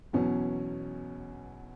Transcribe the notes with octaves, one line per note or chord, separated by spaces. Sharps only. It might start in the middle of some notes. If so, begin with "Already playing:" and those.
E2 B2 F#3 C#4